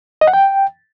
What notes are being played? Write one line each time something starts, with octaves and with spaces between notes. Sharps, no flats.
D#5
F#5
G5